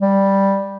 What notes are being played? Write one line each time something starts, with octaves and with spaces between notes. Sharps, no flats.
G3